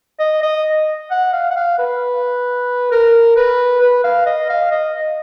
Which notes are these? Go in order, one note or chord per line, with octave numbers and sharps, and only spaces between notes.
D#5
D#5
F#5
F5
F#5
F5
B4
A#4
B4
B4
F5
D#5
F5
D#5